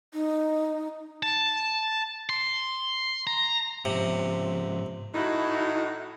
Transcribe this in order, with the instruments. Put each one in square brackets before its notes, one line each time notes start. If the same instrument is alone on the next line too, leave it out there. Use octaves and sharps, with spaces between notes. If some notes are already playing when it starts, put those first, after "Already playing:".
[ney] D#4
[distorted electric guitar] A5
C6
A#5
[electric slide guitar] G#2 F3 [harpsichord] C3
[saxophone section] A2 D#4 [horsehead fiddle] E4 F#4